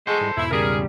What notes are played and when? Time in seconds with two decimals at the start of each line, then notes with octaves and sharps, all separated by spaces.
0.07 G#3 A4 C5 F#5 C#6 G6
0.21 G#2 G3 E4
0.37 E2 G#2 B2 E4
0.51 C#3 G3 G#4 A#4